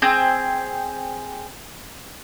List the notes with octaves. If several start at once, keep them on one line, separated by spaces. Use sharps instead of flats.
C4 G#4 C5